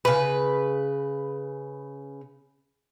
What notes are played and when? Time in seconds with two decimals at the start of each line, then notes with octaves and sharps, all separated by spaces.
0.05 C#3 B4